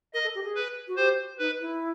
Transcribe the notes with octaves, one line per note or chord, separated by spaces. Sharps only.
A#4 D#5
A4
G4
G#4
B4
F#4
G4 C5
D#4 B4
E4